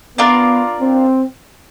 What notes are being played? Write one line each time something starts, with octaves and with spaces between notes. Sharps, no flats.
B3 D4 F4 A#4 D5
C4